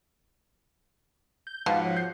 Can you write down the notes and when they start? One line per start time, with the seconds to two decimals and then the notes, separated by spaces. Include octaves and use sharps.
1.47 G6
1.66 G#2 B2 F3 F5 F#5
1.82 C#5
1.97 G6 C7